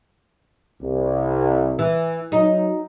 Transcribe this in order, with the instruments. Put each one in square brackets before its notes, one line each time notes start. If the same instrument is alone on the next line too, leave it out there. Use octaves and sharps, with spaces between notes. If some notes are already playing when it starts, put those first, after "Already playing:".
[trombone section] C2
[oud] E3
[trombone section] F#3 [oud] D#4